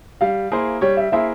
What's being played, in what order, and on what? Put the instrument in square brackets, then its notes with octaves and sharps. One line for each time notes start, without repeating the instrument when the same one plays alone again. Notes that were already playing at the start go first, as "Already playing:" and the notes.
[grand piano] G3 [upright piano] F5
[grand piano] A#3 E4 G#4 C5
[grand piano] G3 [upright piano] C#5
[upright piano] E5
[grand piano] A#3 E4 G#4 C5 [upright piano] E5